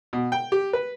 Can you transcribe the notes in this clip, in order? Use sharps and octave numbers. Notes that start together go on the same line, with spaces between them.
B2
G5
G4
B4